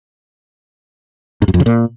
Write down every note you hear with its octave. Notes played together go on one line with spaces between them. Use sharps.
G#2
F#2
F2
C#3
A#2